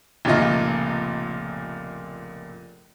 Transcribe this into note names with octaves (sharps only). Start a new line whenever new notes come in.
F1 C#2 A#2 F4 D#5